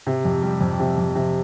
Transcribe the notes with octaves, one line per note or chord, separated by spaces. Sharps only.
C3
F2
G3
F2
C3
F2
C3